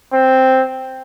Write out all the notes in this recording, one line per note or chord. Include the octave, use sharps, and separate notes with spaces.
C4